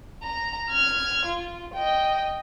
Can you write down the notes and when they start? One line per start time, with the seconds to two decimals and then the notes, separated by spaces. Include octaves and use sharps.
0.23 A#5
0.69 F6 G#6
1.25 F4
1.74 D#5 G5